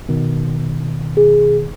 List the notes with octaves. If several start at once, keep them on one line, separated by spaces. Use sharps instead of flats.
B2 D#3
G#4